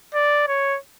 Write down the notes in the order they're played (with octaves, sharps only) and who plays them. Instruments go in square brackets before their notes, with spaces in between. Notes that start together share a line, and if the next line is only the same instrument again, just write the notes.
[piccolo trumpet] D5
C#5